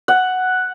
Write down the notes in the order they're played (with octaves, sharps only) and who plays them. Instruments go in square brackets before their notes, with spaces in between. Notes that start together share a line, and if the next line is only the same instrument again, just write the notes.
[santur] F#5